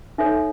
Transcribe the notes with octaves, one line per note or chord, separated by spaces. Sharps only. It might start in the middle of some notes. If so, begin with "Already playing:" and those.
D#4 A4 C#5 E5